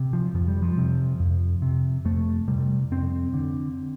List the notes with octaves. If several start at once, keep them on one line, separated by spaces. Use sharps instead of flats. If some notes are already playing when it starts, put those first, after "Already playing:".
Already playing: C3
F3
F2 F3
G3
F3
C3
F2
C3
F2 A3
C3 G3
F2 C4
D3